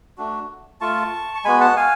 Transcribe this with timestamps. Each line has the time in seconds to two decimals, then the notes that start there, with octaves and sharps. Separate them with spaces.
0.18 A3 D4 F#4
0.81 A3 F4 A5 C#6
1.35 C#6
1.45 G#3 B3 F#4 G#5 B5
1.60 F#5 A5
1.77 F5 G#5